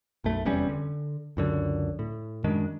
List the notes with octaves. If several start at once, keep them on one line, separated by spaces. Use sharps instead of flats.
B1 F#2 A3
F1 E2 G3 C#4
D3
C#2 F#2 D3
A2
F#2 D#3 G#3 D4